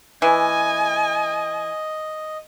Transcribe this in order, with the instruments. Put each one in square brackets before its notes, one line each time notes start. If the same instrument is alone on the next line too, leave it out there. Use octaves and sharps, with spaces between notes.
[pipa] E3 [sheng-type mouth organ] D#5 [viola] G#5